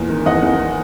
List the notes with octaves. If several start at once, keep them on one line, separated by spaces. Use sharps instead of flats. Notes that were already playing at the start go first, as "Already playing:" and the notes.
Already playing: E2 A#2
D#3
E2 D#5 F#5
E2